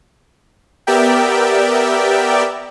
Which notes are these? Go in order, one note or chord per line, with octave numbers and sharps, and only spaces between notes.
B3 G4 A#4 D5 E5 G5